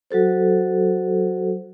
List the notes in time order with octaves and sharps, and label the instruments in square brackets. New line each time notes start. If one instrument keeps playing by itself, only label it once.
[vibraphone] F#3 F#4 A4 C5